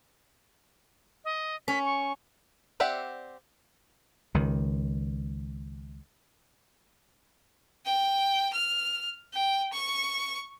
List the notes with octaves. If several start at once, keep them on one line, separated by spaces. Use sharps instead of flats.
D#5
C#4 B6
C#6
C4 G4 D5 E5 F#5
C#2 D#3
G5
F6
G5
C#6